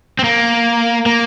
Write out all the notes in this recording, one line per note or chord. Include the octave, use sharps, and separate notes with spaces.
C4
A#3
A#3